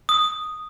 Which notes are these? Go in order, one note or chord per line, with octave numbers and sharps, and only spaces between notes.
D#6